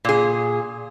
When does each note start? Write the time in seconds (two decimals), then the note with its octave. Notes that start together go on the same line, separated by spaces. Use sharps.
0.05 A#2 G#4